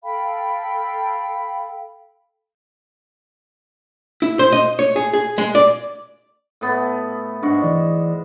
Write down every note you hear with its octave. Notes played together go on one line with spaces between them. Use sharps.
A4 F5 G5 B5
E4
C5
D#5
C#5
G#4
G#4
G#3
D5
A2 B3
G#2 D4 F#4
E3 E4 D5